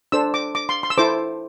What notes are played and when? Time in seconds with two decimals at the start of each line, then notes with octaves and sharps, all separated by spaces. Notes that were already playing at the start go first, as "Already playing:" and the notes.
0.12 D4 A4 C5 E6
0.34 D6
0.55 D6
0.69 C6
0.83 C6
0.90 E6
0.98 E4 A4 C5 D6